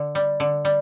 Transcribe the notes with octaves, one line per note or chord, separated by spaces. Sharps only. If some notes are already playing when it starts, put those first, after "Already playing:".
Already playing: D3
G3
D3
G3